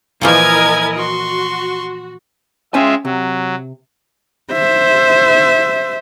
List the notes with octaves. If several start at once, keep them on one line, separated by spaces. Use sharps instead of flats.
A#2 E3 F3 E4 A#4 D#5 G#5 G#6
F#4 C6 C#6
G#3 C#4 F4 E5 G5 G#5
C3 F#3
C5 E5